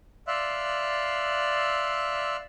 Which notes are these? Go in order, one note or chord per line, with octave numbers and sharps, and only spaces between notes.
D5 E5 F5 C6 E6 F#6